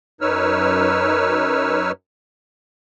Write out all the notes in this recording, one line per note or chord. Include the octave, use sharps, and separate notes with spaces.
F#2 D#4 B4 C#5 E6 F6